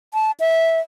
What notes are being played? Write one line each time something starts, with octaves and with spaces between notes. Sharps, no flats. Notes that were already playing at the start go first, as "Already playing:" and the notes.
A5
E5